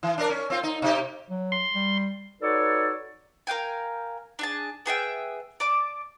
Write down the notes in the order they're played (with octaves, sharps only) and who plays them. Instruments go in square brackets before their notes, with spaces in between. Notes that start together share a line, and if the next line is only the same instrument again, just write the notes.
[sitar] E3
D4 A#4 D5
C#4
C4 F4
D#4
C3 D#4 G4
[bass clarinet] F#3
[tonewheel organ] C6
[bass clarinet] G3
[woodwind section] D#4 F#4 A4 B4 C#5 D5
[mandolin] A#4 F5 G5 G#5
D4 G#4 A5
B3 G#4 E5 G5
D5 A5 D6